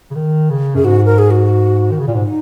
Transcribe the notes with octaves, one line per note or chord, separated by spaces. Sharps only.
C#3
D#3
C#3
F#2 G#4
G#2 F#4
A#4
G#4
F#4
D#3
C#3
A#2
G#2
D#4